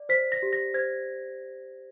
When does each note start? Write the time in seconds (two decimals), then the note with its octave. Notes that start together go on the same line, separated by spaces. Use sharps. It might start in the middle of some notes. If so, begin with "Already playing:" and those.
Already playing: D5
0.09 C5 B6
0.32 A#6
0.43 G4
0.53 A#6
0.74 C5 G#6